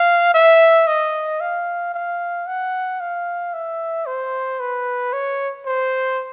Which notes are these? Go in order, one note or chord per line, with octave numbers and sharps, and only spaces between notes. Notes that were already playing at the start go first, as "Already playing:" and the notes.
Already playing: F5
E5
D#5
F5
F5
F#5
F5
E5
C5
B4
C#5
C5